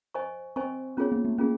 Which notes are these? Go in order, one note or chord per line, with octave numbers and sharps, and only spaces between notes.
C5 D#5 G#5 C#6
C4 C5 D#5 G#5 C#6
B3 C#4 F4 G#4 C#5
A#3
A3
A#3 C#4 F4 G#4